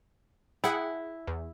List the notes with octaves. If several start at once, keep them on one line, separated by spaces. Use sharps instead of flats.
E4 G#4 F#5 G5
E2